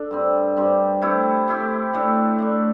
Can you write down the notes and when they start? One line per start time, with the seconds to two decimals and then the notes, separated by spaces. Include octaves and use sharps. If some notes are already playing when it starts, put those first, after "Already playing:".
Already playing: D4 A4
0.11 G2 G3 C4
0.57 G2 G3 C4
1.02 C3 A3 E4 G4
1.48 C3 A3 E4 G4
1.93 A2 A3 D4
2.38 A2 A3 D4